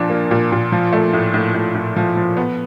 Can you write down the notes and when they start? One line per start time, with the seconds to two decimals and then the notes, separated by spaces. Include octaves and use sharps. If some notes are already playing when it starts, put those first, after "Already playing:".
Already playing: A#2 F3 D4
0.10 A#3
0.31 A#2
0.52 A#2
0.72 F3
0.93 A3
1.13 A2
1.34 A2
1.54 A2
1.75 A2
1.96 F3
2.17 F3
2.37 B3